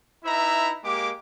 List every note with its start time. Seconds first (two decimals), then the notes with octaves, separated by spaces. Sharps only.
0.25 D#4 E4 B4 E5 A#5
0.84 G#3 A#3 G4 D6